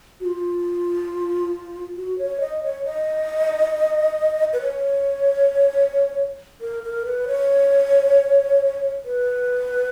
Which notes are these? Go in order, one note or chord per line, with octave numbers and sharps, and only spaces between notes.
F#4
F4
F#4
C#5
D#5
C#5
D#5
B4
C#5
A#4
A#4
B4
C#5
B4